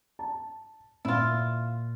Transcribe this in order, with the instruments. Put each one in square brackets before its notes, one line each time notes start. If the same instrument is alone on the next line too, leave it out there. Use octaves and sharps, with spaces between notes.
[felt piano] A5
[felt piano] A#2 [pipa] E4 F4